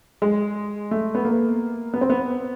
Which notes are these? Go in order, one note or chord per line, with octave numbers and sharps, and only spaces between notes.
G#3
A3
B3
A#3
B3
C4
B3